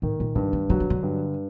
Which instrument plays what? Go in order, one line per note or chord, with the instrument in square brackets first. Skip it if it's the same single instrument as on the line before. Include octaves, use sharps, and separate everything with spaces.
[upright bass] A2 [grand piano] D#3
[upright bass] A#2
[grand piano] G2 [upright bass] D3
[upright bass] D#3
[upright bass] D3 [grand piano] F#3
[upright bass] D#3
D3
[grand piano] G2